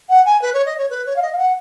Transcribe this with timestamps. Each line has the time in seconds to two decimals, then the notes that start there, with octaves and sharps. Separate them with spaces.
0.09 F#5
0.25 G#5
0.41 B4
0.53 C#5
0.65 D#5
0.77 C#5
0.90 B4
1.06 C#5
1.16 F5
1.22 D#5
1.32 F5
1.38 F#5